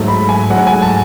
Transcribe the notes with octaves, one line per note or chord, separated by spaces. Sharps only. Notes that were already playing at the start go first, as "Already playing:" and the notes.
Already playing: G#2 F#3 A3
B5
G#5
G#2 F#3 A3 F#5
G#5
A5